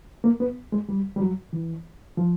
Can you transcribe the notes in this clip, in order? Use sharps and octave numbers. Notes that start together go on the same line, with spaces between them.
A#3
B3
G#3
G3
G3
F#3
E3
F3